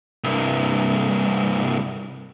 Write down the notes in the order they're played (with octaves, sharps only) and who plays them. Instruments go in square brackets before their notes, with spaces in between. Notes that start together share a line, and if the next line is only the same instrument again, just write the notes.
[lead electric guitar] C2 G2